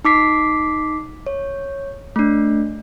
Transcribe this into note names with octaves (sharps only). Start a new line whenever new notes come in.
D#4 D6 B6 C7
C#5
A3 D4